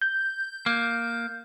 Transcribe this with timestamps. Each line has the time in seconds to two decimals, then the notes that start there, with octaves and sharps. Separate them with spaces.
0.01 G6
0.66 A#3